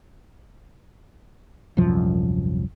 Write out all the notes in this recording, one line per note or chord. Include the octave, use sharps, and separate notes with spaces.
D#1 C2 F#2 F3